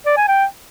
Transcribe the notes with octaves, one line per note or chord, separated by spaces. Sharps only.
D5
G#5
G5